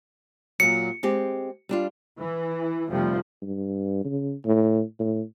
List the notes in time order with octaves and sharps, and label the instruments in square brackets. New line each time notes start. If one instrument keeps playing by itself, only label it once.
[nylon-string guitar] A#2 F#3 [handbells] C#7
[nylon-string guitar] G#3 C4 G4
G3 D4 F4
[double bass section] E3
F1 C3 F3 G3 A3
[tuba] G2
C#3
A2
A2